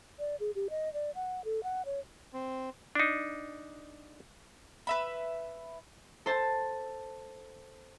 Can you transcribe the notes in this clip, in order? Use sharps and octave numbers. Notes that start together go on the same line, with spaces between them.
D5
G#4
G4
D#5
D5
F#5
A4
F#5
C#5
C4
D4 D#4
B4 E5 B5
A4 C5 A5